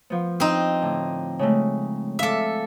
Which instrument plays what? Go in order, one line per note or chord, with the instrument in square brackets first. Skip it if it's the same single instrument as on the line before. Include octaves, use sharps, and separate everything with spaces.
[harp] F3 B3
[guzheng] C4 D#4
[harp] A2 D3
C#3 G#3 A3
[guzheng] A4 E5 [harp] F5 D6